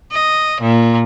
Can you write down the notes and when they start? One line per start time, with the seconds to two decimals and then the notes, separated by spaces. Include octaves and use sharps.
0.11 D#5
0.61 A#2